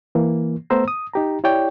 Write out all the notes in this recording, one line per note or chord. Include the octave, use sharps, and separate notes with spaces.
E3 A#3
A3 B3 C5 A#5 E6
D#6
D#4 G4 A#5
E4 G4 C#5 D5 G5